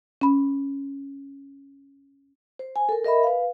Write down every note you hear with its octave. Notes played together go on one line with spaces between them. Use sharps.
C#4 B5
C5
G#5
A4 A#4
A#4 D#5 E5 B5
B4 F5